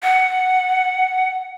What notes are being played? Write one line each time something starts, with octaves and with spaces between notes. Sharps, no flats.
F#5